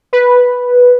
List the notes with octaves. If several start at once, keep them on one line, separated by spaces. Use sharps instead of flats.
B4